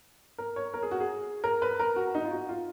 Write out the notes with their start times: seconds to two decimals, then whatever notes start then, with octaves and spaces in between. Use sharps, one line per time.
0.38 A#4
0.56 C#5
0.74 A#4
0.83 G#4
0.91 F#4
1.00 G#4
1.44 A#4
1.62 B4
1.79 A#4
1.96 F#4
2.15 D#4
2.25 F4
2.31 F#4
2.49 F4